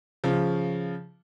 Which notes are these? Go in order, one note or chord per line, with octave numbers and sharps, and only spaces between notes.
C#3 F3